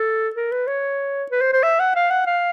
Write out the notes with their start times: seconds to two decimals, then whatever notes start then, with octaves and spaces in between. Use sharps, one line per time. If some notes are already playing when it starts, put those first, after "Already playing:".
Already playing: A4
0.36 A#4
0.52 B4
0.67 C#5
1.31 B4
1.42 C5
1.53 C5
1.63 E5
1.80 F#5
1.96 F5
2.11 F#5
2.27 F5